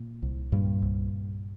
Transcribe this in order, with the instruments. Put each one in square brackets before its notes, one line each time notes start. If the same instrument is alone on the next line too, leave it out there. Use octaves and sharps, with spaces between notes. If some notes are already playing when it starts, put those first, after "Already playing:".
Already playing: [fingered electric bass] A#2
C2
G2 A#2 G3
C2